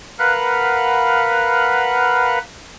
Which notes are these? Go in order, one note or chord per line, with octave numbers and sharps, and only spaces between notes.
A#4 B4 F5 F#5 B5 F#6